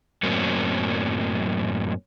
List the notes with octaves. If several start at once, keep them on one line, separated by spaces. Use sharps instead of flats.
F#2 A2 F#3 A#3 C4 C#4